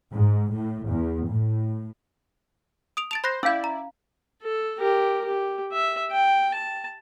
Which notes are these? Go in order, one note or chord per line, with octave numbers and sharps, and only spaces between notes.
G#2
A2
E2
A2
D#6 D7 F7
A5 A6 D7 F7
C5 B5 C6 F#6 A#6
C#4 E4 D5 F5 E6 G6
A#5
A4
G4 A#4
G4
E5
G5
A5